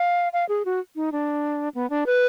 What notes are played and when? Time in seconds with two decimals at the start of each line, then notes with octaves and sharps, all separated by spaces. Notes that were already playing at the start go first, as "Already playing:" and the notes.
Already playing: F5
0.33 F5
0.49 G#4
0.65 F#4
0.96 D#4
1.12 D4
1.75 B3
1.90 D4
2.06 B4